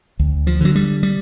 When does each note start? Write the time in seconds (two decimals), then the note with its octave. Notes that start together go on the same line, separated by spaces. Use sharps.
0.19 D2
0.47 F3
0.61 D3 F#3
0.75 G3
1.03 G3